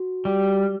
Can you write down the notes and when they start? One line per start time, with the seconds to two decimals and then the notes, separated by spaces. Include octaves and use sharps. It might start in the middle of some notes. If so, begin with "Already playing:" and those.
Already playing: F#4
0.25 G3